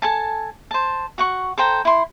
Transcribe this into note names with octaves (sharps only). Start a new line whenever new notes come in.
A4 G#5 A5
C5 A5
F#4 F#5 C#6
A4 C5 G5 A#5
E4 C6